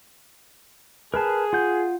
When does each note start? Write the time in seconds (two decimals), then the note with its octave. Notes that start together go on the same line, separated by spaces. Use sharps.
1.14 G#4 A#4 B4 A5
1.53 F4 F#5 G6